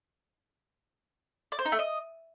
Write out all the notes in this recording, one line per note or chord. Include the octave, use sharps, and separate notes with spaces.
D5
C5
D#4
A3
D#5